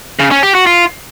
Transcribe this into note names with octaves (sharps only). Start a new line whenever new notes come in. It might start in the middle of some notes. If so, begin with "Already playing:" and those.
C#3
C#4
G4
F#4
F4